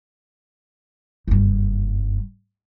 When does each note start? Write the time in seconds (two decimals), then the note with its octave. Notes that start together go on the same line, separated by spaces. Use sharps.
1.28 F#1 G2